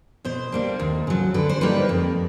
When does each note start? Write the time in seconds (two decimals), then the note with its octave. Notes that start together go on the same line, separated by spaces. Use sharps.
0.25 B2 C5
0.52 G3 A#3 D4
0.79 D#2
1.07 C#3 F#3
1.34 D3 B4
1.49 C5
1.61 G3 A#3 D#4 B4
1.89 F2